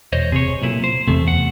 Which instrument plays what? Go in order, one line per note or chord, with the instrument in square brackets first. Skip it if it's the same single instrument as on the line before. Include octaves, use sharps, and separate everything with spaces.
[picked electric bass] E1 [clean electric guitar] C5 C#5 D#5
[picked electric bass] C3 [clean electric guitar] G#4 C#5
[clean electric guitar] B1 A#2 E4
C5
[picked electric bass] E2 C3 [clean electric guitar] A3
[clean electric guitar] F#5